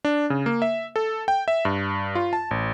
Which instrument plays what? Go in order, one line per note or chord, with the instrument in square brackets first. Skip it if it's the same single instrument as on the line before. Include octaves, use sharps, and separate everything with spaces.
[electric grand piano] D4
C#3
A#3
E5
A4
G5
E5
G2
F4
A5
A1